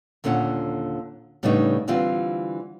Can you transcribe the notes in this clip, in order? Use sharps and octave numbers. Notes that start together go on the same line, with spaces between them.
D#2 A#2 D3 C#4 F#5
A2 C#3 G3 B3 D4 D#4
D3 E3 G3 C4 F4